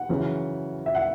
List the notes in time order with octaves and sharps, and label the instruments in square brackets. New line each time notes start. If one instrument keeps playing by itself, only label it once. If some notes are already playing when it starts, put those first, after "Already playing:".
Already playing: [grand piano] F#5
F#2 C#3 E3
E5
F#5